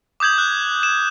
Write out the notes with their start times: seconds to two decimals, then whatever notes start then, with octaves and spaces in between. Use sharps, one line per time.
0.20 D6 D#6 G6 G#6 F#7
0.38 F#6
0.83 E7